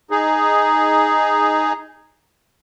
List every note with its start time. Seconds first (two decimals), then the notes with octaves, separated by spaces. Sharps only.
0.11 D#4 G#4